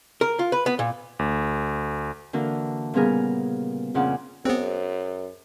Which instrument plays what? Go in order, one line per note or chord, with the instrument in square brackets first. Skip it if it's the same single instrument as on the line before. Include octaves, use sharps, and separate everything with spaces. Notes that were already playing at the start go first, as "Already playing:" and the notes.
[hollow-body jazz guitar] A#4
F4
B4
B3
A#2
[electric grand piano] D2
[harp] D3 E3 A#3 F#4 A#4
A#2 C#3 G3 B3 G#4 A#4
F2 A#2 C#3 F4 D5 F#5
[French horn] F#2 [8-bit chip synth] B3 C4 [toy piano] G#4 C5 G#5